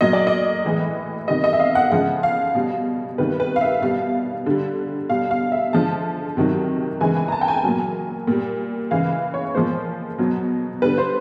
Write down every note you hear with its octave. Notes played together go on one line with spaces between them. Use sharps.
A#2 F#3 D#5
D5
D#5
A2 E3 G#3
C3 D#3 G3 D#5
D#5
E5
F5
F#5
C#3 F3 G#3 F#5
F5
B2 G3
C3 D#3 G3 B4
B4
F5
E5
B2 G3 F5
D3 G3
B2 G3 F5
F5
E5
D3 F3 G#3 A5
C3 D#3 F#3
C#3 E3 G#3 G#5
G#5
A#5
A5
G5
G#5
A#2 F#3
A#2 G3
C#3 E3 G#3 F5
C#5
A#2 F3 G#3 C5
B2 F#3
D3 G3 B4
C5